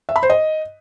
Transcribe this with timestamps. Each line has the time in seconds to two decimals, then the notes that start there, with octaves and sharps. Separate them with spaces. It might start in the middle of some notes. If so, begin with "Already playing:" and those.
0.09 E5
0.16 B5
0.23 C5
0.30 D#5